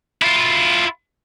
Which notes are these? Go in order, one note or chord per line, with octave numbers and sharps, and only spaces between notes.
E4 F4